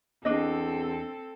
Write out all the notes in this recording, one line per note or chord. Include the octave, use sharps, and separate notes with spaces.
E2 C4 D4 A4 D#5